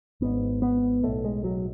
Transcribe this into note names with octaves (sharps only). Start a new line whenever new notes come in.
G#1 G#2 B3
B3
B1 A2 A3
G#3
F#3